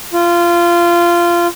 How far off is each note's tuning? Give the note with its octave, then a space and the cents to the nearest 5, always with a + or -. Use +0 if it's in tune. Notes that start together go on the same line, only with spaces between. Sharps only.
F4 -20